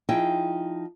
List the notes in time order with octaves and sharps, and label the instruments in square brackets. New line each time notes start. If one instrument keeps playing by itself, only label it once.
[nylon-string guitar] F3 D#4 E4 G#4 G5